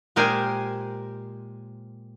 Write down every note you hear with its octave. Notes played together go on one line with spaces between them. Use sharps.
A#2 G#3 G4 A#4 C5 G#5